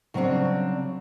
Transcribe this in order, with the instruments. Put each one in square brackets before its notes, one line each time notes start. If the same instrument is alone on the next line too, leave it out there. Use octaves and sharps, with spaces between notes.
[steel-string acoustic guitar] C#3 F#3 G3 C4 D4